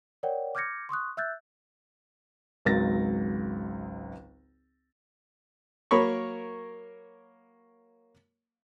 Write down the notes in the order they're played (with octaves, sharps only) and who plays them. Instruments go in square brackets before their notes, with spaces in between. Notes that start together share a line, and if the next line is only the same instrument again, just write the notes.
[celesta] A#4 C#5 D5 F#5 G5
D6 F6 G6 G#6 A#6 C#7
C6 C#6 D#6 F#6
E5 E6 F#6 G6 A6
[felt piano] G#1 C#2 F#3 A6 A#6
[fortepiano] F#3 A#3 A#4 C#5 B5 C#6